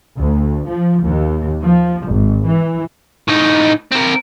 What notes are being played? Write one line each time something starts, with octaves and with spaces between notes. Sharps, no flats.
D2
F3
D#2
F3
G#1
E3
A2 D#4
C4 A#4